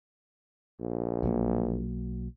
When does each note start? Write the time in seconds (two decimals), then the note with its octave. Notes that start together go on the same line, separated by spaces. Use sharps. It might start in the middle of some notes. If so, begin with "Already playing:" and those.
0.80 A#1
1.23 B1 F#3 A#3